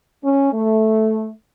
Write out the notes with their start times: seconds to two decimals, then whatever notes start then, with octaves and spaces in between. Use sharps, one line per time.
0.23 C#4
0.52 A3